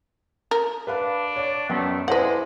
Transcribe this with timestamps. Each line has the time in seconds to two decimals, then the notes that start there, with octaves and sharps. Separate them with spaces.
0.51 A#4
0.87 D4 B4 F5 B5
1.36 C#5 D5
1.69 F#2 A3 B3 G5
2.08 G#3 E4 B4 C5 D5 F#5